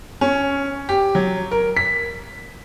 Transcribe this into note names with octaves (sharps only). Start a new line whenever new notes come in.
C#4
G4
F#3
A#4
B6